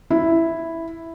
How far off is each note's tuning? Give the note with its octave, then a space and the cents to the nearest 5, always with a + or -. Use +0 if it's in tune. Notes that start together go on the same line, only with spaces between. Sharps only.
E4 +0